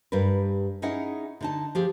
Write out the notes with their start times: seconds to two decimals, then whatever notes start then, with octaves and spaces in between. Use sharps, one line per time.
0.12 G2 G4 A#4 B4
0.82 C#4 D#4 E4 G#4 D#5 F#5
1.41 D3 D#4 A5
1.75 F3 G4 G#4